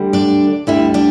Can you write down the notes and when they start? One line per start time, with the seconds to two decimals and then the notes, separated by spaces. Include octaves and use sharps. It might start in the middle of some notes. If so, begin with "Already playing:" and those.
Already playing: D2 D3 G3
0.13 D4 D5
0.67 D2 D3 G3 E4 E5
0.94 D4 D5